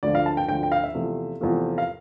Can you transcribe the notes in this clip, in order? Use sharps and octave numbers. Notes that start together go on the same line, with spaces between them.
D2 D3 F3 D5
F5
A5
G5
D2 D3 F3 G5
G5
F5
E5
E2 C3 F3 A3
E2 C3 F3 A3
F5